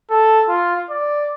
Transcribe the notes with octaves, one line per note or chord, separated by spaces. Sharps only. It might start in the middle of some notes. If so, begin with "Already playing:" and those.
A4
F4
D5